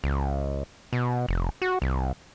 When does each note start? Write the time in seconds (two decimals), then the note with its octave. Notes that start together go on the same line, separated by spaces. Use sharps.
0.04 C#2
0.93 B2
1.29 F1
1.62 F#4
1.82 C2